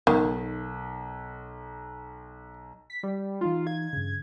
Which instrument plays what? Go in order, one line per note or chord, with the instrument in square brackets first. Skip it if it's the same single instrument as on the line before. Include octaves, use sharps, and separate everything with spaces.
[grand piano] B1 [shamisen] D#3
[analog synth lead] B6
G3
[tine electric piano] E3 D#4 F5 [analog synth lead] F4
[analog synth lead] G#6
[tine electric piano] G2 C#3